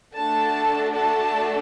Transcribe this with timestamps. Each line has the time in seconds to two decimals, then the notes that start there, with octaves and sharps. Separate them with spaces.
0.17 A3 D4 F#4 A4 A5
0.93 A5